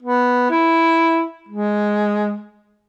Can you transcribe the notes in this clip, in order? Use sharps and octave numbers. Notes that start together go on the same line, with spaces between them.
B3
E4
G#3